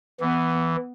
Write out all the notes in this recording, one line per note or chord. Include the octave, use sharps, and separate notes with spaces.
E3 B3